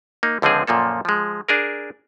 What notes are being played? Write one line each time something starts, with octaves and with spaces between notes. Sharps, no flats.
A#3 D#4
C#2 D3 F3 C4 G#4
F#2 A#2 F3 A#3 A4
F3 G#3
D4 G#4 A#4